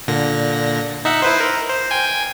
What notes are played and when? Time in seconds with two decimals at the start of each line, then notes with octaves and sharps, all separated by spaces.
0.08 A#2 D3 A#6
1.05 D#4 E5 F#5
1.22 E4 B4 C5
1.40 A#4
1.69 C5
1.91 G5 G#5